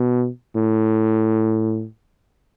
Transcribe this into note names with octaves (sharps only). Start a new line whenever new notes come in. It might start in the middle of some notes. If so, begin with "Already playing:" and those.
Already playing: B2
A2